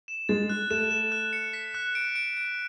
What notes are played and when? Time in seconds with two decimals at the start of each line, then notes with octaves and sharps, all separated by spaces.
0.08 E7
0.29 G#3 A6
0.49 F#6
0.70 A3 E7
0.91 E7
1.12 F#6
1.33 C#7
1.53 B6
1.74 F#6
1.95 D7
2.16 D7
2.37 D7